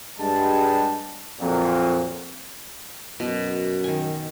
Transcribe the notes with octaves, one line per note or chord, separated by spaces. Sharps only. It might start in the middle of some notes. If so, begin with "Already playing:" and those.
G2 G3 G#3 A5
F2 A#2 F#3
F#2 B2
D#3 G#5